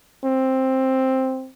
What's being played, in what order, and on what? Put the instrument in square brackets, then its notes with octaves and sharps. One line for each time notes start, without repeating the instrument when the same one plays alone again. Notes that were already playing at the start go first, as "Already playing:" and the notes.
[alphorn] C4